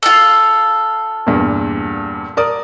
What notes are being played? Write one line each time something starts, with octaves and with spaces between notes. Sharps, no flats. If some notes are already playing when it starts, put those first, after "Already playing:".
F4 A4
E2 G2 A#2
A#4 D5 D#6